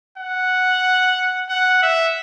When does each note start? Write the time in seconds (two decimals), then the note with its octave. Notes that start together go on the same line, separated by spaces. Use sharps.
0.18 F#5
1.49 F#5
1.83 E5